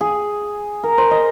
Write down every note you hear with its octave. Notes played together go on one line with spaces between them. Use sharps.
G#4
A#4
C5
D#5